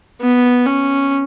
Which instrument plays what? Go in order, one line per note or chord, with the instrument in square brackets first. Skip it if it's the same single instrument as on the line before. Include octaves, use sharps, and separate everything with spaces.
[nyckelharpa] B3
C#4